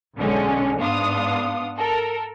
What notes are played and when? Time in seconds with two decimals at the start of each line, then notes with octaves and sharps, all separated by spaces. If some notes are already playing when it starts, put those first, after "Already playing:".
0.16 B1 D3 G#3 C#4
0.79 G#2 B3 D4 F5 C6 D#6
1.78 A4 A#4